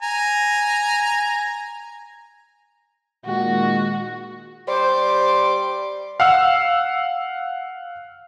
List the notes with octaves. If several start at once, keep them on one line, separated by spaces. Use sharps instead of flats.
G#5 A#5
A#2 D#3 G#3 F#4
G3 C5 C6 D6
F5 F#5 E6